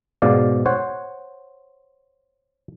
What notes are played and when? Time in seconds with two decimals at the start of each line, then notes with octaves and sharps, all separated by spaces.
0.22 G#2 B2 D5 F5
0.66 C5 C#5 F#5